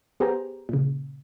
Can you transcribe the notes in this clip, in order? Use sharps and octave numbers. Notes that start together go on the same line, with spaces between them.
B3 G4 G#4 C5 G5 A#5
A#2 C#3